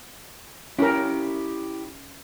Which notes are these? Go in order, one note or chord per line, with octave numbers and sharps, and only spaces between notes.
C#4 E4 G4 A#4